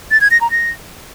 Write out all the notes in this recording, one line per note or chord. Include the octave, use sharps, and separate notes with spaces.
A6
G#6
A#6
A#5
A#6